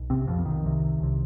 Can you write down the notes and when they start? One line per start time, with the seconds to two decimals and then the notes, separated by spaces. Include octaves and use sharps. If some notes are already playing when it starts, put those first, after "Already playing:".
Already playing: B1
0.10 C3 C4
0.27 B1 F2 B2 F3
0.45 D#3
0.64 C2 C3
1.00 C2 C3